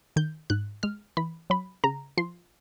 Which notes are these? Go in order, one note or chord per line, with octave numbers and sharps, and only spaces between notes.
D#3 G6
G#2 F#6
G#3 F6
E3 B5
F#3 B5
C#3 A#5
F3 C6